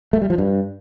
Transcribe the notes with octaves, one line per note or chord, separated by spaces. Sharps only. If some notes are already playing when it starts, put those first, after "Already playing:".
A3
G3
F3
G2